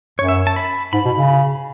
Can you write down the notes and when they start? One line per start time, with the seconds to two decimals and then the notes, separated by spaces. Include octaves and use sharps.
0.19 F#2 C#5
0.28 E5
0.47 A5
0.56 B5
0.93 G#2 B5
1.05 B2
1.17 C#3